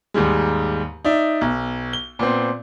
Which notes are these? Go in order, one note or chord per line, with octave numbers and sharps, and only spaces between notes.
D#2 G#2 G3 G#3
D#4 D5 E5
B1
G7
A#2 B3 C4